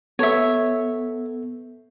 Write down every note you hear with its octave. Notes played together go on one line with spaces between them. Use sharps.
B3 A4 C#5 E5